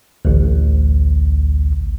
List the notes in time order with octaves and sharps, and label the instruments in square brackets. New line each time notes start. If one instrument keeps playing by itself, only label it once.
[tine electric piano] A1 D2